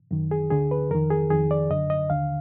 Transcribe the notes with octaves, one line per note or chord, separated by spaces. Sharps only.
F#2 D#3
G#4
D2 D3 G#4
B4
F2 D#3 A#4
G#4
F2 D#3 G#4
D5
F#2 D3 D#5
D#5
D#2 D3 F5